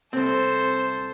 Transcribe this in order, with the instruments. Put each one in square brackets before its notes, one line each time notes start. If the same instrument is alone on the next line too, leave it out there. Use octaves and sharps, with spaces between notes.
[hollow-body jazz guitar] C2 C4 [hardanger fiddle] A4 C5